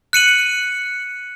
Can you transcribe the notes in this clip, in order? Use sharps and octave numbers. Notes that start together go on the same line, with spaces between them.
F#6 C#7 D#7 F#7